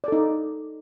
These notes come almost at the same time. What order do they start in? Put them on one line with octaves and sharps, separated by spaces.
D5 A4 D#4